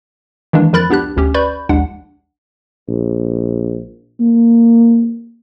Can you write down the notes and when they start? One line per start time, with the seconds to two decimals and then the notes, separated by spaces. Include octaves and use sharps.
0.53 D#3 E3 G#3 A#3 D4
0.73 F2 F3 A#4 B5 F#6 A6
0.89 C#2 B3 D4 G4 F#6
1.16 G1 D2 C#4 G4
1.34 B4 D5 B5 C#6 G6
1.69 A#1 D#2 G#3 D4 F#5
2.88 A#1
4.20 A#3